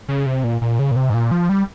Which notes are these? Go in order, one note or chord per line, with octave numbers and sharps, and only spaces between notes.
C#3
C3
A#2
A#2
C#3
A#2
C3
G#2
A#2
F3
G3